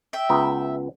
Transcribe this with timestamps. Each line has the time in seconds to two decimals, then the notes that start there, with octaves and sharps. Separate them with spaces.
0.13 E5 G5
0.29 C#2 B3 A#5